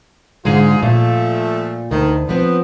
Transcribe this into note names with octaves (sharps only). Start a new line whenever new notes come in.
G#2 D3 G#3 D#4 F4 G#4
A#2 F3 A3
D2 D#3
F3 B3 C4